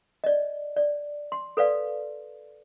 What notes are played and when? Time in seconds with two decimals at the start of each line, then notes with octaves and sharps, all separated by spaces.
0.24 D5 D#5
0.76 D5
1.32 C6
1.57 A4 B4 D5 F5